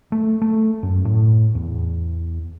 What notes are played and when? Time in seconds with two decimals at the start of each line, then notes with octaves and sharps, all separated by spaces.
0.12 A3
0.42 A3
0.83 F#2
1.05 A2
1.55 E2